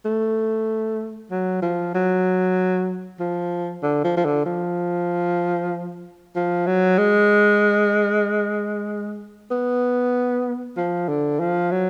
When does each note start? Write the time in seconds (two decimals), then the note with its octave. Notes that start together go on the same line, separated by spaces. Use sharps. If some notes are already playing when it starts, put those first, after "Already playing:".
0.05 A3
1.31 F#3
1.62 F3
1.94 F#3
3.20 F3
3.82 D3
4.04 F3
4.17 F3
4.25 D3
4.45 F3
6.36 F3
6.67 F#3
6.98 G#3
9.51 B3
10.77 F3
11.08 D3
11.40 F3
11.71 F#3